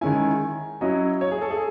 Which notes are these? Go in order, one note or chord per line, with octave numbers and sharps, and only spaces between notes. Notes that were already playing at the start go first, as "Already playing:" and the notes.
D#3 G#3 C#4 E4 G#5
F#3 C#4 E4 D#5
C#5
G#4
A4
G#4